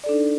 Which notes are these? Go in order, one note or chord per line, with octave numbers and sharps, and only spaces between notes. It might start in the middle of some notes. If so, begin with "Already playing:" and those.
D4 D#4 A4 D5